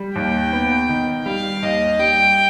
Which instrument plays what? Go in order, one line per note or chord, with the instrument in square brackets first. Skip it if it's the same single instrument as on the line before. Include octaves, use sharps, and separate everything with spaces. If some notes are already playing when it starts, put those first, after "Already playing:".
Already playing: [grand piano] G3
[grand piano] D#2 [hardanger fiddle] G5
[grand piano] B3
D#3
[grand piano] G3 [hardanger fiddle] F5
[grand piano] D#2 [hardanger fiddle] D#5
[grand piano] G3 [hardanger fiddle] G5